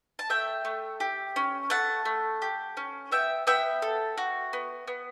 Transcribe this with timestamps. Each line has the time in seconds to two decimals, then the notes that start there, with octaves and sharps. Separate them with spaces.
0.19 A5
0.30 A3 E5 G5
0.65 A3
1.00 G4
1.36 C#4
1.70 A3 F#5 A5
2.05 A3
2.42 G4
2.77 C#4
3.12 B3 E5 G5
3.47 B3 E5 G5
3.82 A4
4.18 F#4
4.53 B3
4.87 B3